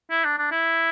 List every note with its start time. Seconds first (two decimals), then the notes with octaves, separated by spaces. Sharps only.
0.11 E4
0.25 D4
0.38 D4
0.52 E4